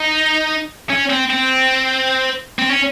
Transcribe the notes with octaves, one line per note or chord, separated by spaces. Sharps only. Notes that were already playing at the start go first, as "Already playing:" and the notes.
Already playing: D#4
C#4
C4
C4
C4
C#4